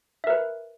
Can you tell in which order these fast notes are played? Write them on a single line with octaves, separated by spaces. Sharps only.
E5 A#4 B4